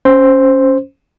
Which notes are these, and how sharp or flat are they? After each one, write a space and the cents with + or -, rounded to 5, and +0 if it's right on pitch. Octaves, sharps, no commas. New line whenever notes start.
C#4 +0 C5 +0